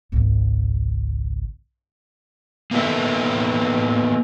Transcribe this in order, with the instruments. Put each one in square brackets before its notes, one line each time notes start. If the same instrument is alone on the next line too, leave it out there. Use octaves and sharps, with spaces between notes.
[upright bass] G#1 C#2
[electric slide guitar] A#3 B3 D#4 F#4 A4 E5